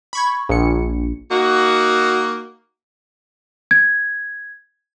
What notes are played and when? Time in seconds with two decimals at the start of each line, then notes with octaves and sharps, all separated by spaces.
0.13 B5 C#6 G#6
0.49 A#1 C#7
1.31 A#3 D#4 F#4
3.71 G#6